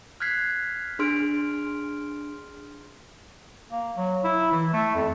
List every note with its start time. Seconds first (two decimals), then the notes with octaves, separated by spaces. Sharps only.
0.20 F6 F#6 G#6 B6 C7
0.99 D4 G#4 C6 F6 D7
3.72 A#3
3.97 F#3
4.24 E4
4.52 E3
4.73 A3
4.95 F2